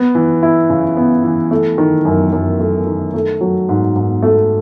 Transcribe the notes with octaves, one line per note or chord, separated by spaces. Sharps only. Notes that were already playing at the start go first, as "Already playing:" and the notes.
Already playing: B3
E3
E4
C#3
B3
E3
A3
D#3
F#2
F#2
A3
D#3
A3
F#3
G#2
G#2
A3